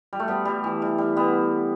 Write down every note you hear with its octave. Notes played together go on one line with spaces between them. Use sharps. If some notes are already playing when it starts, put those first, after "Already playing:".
G3
A3
G3 B3
G3
E3
G3
G3
G3 B3